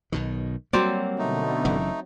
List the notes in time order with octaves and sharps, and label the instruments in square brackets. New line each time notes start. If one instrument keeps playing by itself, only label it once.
[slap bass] B1 B2 D#3
[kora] F#3 C4 D5 [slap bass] G3 A#3
[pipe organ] B2 D3 [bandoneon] A3 D#4
[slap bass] F#1 F#2 E3